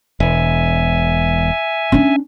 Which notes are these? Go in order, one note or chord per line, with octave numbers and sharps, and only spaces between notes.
E1 E5 G#5
C#4 D4